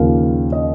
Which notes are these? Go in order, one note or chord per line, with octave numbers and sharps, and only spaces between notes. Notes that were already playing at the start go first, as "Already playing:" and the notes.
Already playing: D#2 C#3 F3 A#3 F5
D#5